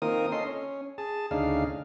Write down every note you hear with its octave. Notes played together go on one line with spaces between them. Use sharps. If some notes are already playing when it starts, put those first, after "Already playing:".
D#3 A#3 C4 F4 A#4 D#6
C#4 A4 D#5 C6
C#4
G#4 A5
D2 C#3 D4 D#4 G#4 F5